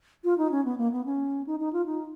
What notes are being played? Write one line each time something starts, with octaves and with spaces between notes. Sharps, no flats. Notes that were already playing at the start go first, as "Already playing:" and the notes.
F4
D#4
C#4
B3
A#3
B3
C#4
D#4
D#4
F4
D#4